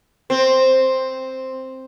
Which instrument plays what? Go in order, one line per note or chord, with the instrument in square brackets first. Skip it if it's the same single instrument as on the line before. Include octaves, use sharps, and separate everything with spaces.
[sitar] C4